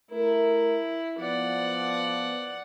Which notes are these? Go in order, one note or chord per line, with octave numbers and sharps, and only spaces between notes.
A3 E4 A#4
F3 B3 D5 F#5